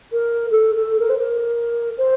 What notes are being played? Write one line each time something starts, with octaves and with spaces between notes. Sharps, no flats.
A#4
A4
A4
A#4
C5
A#4
C5